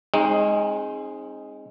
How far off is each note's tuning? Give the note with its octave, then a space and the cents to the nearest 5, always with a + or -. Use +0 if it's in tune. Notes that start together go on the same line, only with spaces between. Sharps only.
G#3 +0 C4 +40 D#4 +0